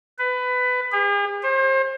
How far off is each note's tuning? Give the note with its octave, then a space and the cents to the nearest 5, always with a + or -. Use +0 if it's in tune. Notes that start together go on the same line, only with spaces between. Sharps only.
B4 +20
G#4 -45
C5 +35